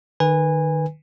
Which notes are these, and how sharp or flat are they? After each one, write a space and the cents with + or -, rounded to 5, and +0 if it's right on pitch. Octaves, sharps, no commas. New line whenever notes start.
D#3 -30 B4 -5 G#5 -20